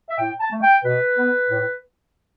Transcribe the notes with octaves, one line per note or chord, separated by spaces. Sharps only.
E5
A2 G5
A5
A3
G5
B2 B4
B3
A2